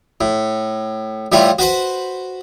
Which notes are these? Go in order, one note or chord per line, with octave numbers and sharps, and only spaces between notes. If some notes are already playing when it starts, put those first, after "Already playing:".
A2
A2 G3 E4 F4
F#4 B4 C5 F#5